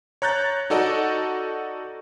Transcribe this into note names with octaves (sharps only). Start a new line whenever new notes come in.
C#5 A#5 F#6 G6 A6
D#4 F#4 A4 D5 D#5